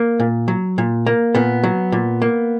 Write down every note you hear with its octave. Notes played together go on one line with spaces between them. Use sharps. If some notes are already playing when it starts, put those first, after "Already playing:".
Already playing: A#3
A#2
F#3
A#2
A#3
A#2 B3
F#3
A#2
A#3